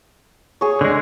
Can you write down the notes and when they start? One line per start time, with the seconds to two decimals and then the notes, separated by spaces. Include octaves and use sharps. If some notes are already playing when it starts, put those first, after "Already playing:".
0.61 G#4 C#5
0.81 D3 G#3